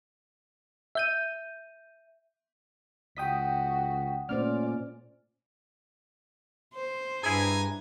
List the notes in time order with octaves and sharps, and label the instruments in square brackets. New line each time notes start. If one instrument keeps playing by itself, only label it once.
[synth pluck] E5 G6 D#7
[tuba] C#2 [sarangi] F#4 [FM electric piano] G5 D#6 B6
[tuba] A#2 [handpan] A3 C#4 C5 [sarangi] D5 [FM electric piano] F6
[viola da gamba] C5
[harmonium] G2 [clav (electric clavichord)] E4 G#4 [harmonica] G#5 A#5